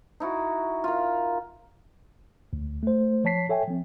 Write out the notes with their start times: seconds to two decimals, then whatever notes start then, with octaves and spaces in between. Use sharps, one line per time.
0.20 D#4 E4 F#4
0.84 F4 A#4
2.53 D2
2.83 A3 C5
3.24 F3 C#5 A5 B6 C7
3.49 A4 C#5 E5 G5 G#5
3.67 F3 C4